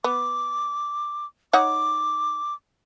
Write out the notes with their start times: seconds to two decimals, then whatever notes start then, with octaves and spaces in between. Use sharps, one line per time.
0.04 B3 D6
1.53 D#4 C#5 F#5 D6